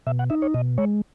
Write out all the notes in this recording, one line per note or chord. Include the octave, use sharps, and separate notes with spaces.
B2 E5
F#5
D#4 E5
C#5
B2 D#5
G#3 C#5